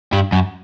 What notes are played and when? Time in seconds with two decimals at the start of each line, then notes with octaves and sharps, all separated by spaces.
0.12 G2
0.32 F#2